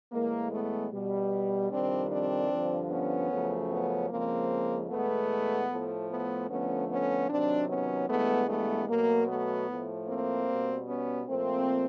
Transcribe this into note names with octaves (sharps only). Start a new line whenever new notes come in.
A2 E3 G#3 A#3
A3 B3
B2 G3
F2 C3 D#3 G3 C4 D4
C4 D4
G2 D3 F3
B3 C#4
F#2 C#3 F3 A3
B3 C#4
F2 C#3 F3 G#3 A#3 C4
E2 B2 G#3 A3 B3
A2 F3 A3
A3 B3
F2 D3 F3 A3 B3 C#4
B3 C#4
C3 D#3 F#3 C4 D4
B3 C#4
G2 E3 G#3 A3 B3
A3 B3
B2 F#3 A3 A#3
A3 B3
A2 F3 A3
A#3 C4
B2 G3
B3 C#4
A#2 F3 A3 A#3 C4